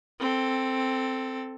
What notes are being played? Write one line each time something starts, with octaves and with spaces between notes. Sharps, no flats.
C4 A4